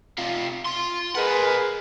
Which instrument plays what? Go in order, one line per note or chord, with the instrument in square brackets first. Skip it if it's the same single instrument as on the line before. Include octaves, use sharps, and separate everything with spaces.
[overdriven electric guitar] C3 F4
F4 C6
[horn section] G#4 A#4 B4 [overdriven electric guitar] D#5 F#5